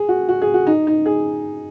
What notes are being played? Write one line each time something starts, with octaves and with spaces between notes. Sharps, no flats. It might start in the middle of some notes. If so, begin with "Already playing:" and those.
Already playing: G#4
F#4
F#4
G#4
F#4
D#4
D#4
G#4